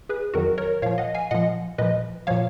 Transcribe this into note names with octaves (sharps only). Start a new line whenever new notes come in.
G#4 B4
F2 D#3 F#3 F#4 A#4
A#4 C#5
A#2 F3 C#5 F5
D#5 F#5
F5 G#5
A#2 F3 D#5 F#5
A#2 F3 B4 D#5
A#2 F3 C#5 F5